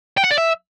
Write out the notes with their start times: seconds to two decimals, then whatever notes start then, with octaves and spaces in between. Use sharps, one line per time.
0.17 G5
0.24 F#5
0.31 D5
0.37 E5